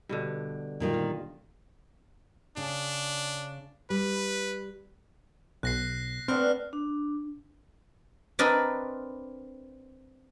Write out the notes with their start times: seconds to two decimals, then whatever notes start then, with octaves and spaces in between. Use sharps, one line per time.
0.09 G2 B2 D3
0.80 A#2 D#3 G3
0.94 F4
2.57 C#3 D4
3.90 G3 B4
5.63 B1 F#6 A#6 C7
6.28 A3 B3 C4 D4 F6
6.73 D4
8.39 C4 D4 A#4 B4 D5 D#5